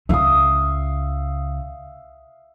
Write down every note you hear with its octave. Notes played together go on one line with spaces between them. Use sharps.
C#2 C#3 E5 F5 D#6